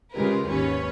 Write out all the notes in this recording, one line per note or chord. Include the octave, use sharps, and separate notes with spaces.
C#3 G#3 F4 G4 A#4 B4
G#1 D#2 C#4 B4 C#5